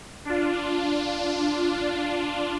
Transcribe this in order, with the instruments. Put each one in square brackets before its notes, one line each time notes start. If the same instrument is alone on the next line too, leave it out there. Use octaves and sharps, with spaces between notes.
[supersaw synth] D4 F4